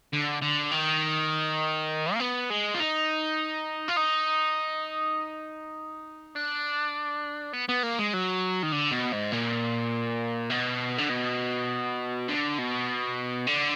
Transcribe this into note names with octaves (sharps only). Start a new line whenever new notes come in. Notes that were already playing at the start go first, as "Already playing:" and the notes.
D3
D3
D#3
A#3
B3
G#3
F4
D#4
F4
D#4
D4
B3
B3
A#3
G#3
F#3
D#3
D3
B2
G#2
A#2
B2
D3
B2
D3
B2
D3